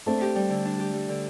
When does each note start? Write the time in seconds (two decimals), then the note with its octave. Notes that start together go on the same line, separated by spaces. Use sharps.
0.06 A3 C4 D4
0.22 G4
0.36 G3
0.50 D3
0.65 D4
0.80 G4
0.94 G3
1.09 D3